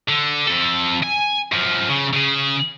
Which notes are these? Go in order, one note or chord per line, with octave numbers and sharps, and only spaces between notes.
D3
F2 A4
G#5
F#2 F3
C#3
C#3 G#4